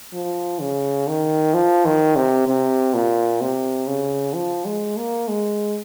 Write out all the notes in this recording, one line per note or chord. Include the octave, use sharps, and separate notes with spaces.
F3
C#3
D#3
F3
D#3
C3
C3
A#2
C3
C#3
F3
G#3
A#3
G#3